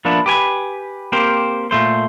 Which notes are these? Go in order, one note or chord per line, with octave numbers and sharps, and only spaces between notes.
F3 A#3 B3 D4 E4
G4 B4 G#5
A#3 C4 G4 A#4 C5
A#2 A3 C5